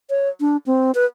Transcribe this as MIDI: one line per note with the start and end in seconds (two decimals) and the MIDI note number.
0.10 0.29 73
0.40 0.57 62
0.66 0.91 60
0.95 1.05 71